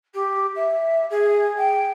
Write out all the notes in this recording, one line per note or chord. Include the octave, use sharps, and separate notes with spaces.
G4
E5
G#4
G5